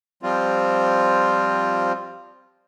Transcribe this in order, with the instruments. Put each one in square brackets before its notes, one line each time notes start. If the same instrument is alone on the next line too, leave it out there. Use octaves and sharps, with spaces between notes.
[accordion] F3 G3 C4 F4